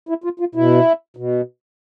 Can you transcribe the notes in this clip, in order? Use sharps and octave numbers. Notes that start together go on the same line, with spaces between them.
E4
F4
F4
B2 E4
B2